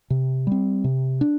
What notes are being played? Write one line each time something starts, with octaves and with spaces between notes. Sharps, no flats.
C3
G3 C4
C3
D4